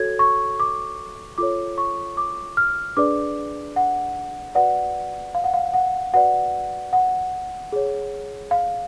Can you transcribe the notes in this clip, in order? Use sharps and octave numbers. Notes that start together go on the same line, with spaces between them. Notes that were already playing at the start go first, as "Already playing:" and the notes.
Already playing: F#4 A4 C#5 G#6
C#6
D6
F4 A4 C#5 D6
C#6
D6
F6
D4 G#4 B4 D5 D6
F#5
F#4 B4 D5 F#5
F5
F#5
F5
F#5
F#4 B4 D5 F#5
F#5
G#4 C#5
F5